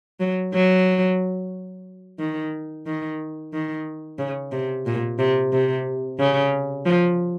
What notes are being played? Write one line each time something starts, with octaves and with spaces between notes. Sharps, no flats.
F#3
F#3
D#3
D#3
D#3
C#3
C3
A#2
C3
C3
C#3
F3